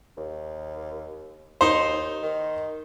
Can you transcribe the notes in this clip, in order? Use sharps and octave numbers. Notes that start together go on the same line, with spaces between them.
D#2
D#2 D#4 C5
D#3